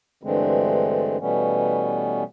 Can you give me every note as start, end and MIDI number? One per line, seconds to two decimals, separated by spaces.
0.23 1.17 43
0.23 1.17 50
0.23 1.17 52
0.23 1.17 56
0.23 1.17 57
0.23 1.17 60
1.20 2.23 47
1.20 2.23 52
1.20 2.23 55
1.20 2.23 57
1.20 2.23 59
1.20 2.23 61